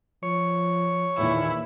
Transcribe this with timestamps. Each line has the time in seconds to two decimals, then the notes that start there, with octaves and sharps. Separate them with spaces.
0.23 F3 C#5
1.17 E2 A#2 D#3 E4